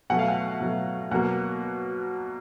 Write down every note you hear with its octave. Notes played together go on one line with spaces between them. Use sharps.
B2 F#3 A3 F#5
F5
F#5
B2 F#3 A3
B2 F#3 A#3 F#5